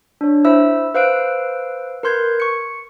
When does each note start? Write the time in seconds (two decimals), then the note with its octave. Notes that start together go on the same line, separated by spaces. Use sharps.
0.21 D4 C#5
0.45 E4 C5 E5 E6
0.95 B4 C5 F5 E6 F#6 D7
2.03 A#4 B4 C6 G6 G#6
2.40 C#6 C#7